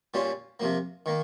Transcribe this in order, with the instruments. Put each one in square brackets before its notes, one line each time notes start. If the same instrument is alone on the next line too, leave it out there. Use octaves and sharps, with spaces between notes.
[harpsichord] A#2 G3 C#4 F4
C3 F3 A#3
D#3 A#3